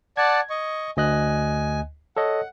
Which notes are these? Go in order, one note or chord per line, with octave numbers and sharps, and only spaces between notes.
D5 F#5 A5 G#6
D#5 C#6
D2 D#5 G#5 F#6
A4 C#5 D#5 F#5